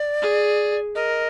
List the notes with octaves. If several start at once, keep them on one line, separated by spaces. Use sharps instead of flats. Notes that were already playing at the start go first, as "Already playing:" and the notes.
Already playing: D5
G#4
A#4 D#5